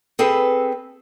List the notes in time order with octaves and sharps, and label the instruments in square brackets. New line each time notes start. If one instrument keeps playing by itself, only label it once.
[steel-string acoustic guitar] C4 G#4 A4 B4